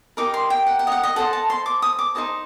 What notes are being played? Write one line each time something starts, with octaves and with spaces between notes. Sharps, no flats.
D#4 G4 A#4 D6
C6
G5
F#5
F#5
D#5
F#5
D#5
A4 C5 D#5 F#5
A5
C6
D6
D#6
D6
D#4 A4 C5 D#5